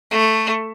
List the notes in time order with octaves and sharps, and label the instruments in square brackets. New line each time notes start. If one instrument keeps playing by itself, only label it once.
[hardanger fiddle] A3